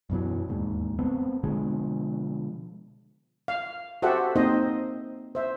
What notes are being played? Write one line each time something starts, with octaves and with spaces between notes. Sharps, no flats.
F#2 B2 E3 F#3
E1 D#2 G#2
A3 B3 C4
B2 D3 F3 G#3
F5
F#4 G4 A4 C5 E5 F#5
A#3 C4 D#4 C5 D#5
C5 E5